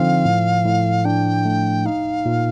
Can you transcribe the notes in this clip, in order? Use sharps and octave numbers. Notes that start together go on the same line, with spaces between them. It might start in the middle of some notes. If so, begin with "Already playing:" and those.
Already playing: D3 F3 C4 D#4 F5
A2
A2
D4 G5
A3
D#4 F5
A#2